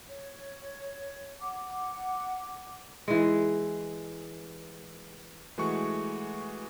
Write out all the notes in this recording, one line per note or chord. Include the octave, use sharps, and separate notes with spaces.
C#5
F#5 D6
E3 G#3
E3 G#3 A3 F#4 C#6